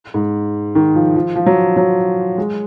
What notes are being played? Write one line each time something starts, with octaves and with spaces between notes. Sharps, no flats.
G#2
D#3
F3
F3
F3
F#3
F#3
G#3